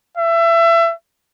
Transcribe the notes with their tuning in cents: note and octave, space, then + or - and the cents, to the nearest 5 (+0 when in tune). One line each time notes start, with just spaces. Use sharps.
E5 +25